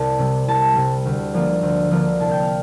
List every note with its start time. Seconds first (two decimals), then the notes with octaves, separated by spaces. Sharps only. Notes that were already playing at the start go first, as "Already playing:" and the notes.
Already playing: C2 A5
0.19 C3 G3
0.48 C2 A5
0.76 C3 G3
1.05 D2
1.34 D3 F3 A#3 F4
1.62 D2
1.91 D3 F3 A#3 F4
2.20 C2 A5
2.31 G5
2.43 F5